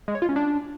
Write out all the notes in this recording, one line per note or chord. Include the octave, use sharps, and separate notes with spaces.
G#3
C#5
F4
C#4
D4